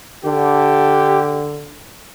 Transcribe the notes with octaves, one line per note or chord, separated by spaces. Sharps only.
D3 G4